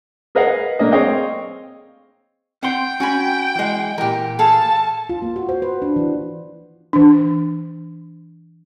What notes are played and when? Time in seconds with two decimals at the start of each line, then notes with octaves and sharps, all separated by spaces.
0.35 G#4 A#4 B4 D#5 F5 F#5
0.79 A3 A#3 D4 D#5
0.92 C4 G#4 C#5 D#5 F5 G5
2.63 C4 F#5 G5 C6
3.00 C#4 F#4 G#5 B5
3.55 E3 G#3
3.98 A#2 E3 G4 A#4
4.39 G#4 A4 F5 A5
5.09 F4
5.22 A#3
5.36 F#4
5.49 C5
5.62 B4
5.82 D4
5.96 E3
6.93 E3 D4